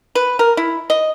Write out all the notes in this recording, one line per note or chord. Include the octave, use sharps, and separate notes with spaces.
B4
A#4
E4
D#5